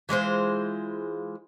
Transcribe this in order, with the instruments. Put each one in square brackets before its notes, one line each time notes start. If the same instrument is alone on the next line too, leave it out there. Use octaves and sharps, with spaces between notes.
[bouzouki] E3 G#3 F4 C5